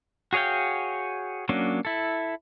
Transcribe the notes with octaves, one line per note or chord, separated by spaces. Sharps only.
F#4 G#4 C#5 F5 G5
F#3 A#3 C#4 D4
E4 A4